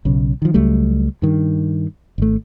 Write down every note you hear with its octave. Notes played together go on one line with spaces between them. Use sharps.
B1 C#3
D#3 F3
C#2 F#3 G3 A3
G2 D#3
G#1 A3